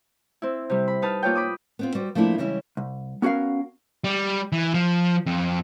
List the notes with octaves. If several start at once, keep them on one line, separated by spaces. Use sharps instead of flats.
C4 E4
C3 G3
B5
D#4 B4 A5 F6
A#3 F4 C#5 G5
B5 D6 D#6
B3 C4 F4
G3 F#4 B4 C5
F3 A3 A#3 D4 E4 F4
C#3 E3 G3 G#3 C#4 E4
C2
B3 C#4 F#4 A#4 F5
G3
E3
F3
F2